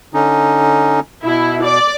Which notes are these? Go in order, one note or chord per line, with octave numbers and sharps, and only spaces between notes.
D3 C#4 D#4
B2 E4
D5